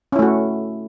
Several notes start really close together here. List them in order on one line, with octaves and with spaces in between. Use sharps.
C#4 E4 A3 F#4